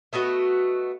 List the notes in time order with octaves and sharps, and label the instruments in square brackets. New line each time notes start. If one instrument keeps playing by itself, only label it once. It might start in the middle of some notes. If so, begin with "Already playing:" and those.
[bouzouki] A3 B3 F#4 D#5